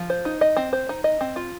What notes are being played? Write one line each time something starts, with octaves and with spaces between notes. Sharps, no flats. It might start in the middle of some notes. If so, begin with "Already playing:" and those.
Already playing: F3
C5
D#4
D#5
C4
C5
D#4
D#5
C4
F4